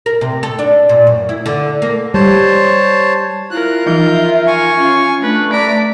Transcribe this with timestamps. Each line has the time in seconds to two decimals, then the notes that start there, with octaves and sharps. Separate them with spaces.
0.06 A#4
0.21 C3
0.43 A4
0.59 D4
0.89 A#2
1.07 F#2
1.29 E4
1.46 D3
1.82 A#3
2.14 G3 C5 C#5 A5
3.51 E4 F4 A#4 F#6
3.86 E3 F3 D#4 E5 G6
4.47 G#5 C#6
4.77 C#4 F4
5.22 A3 D4 B4
5.53 D5 A#5 B6 D7